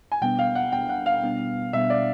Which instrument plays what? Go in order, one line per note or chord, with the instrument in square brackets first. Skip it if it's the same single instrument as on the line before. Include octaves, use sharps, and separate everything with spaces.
[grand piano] G#5
[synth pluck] B2 G3 B3 D4 [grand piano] G5
[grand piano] F5
F#5
[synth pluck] B2 G3 B3 D4 [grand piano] G5
[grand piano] F#5
F5
[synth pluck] B2 G3 B3 D4
[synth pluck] B2 G3 B3 D4 [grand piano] E5
[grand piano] D5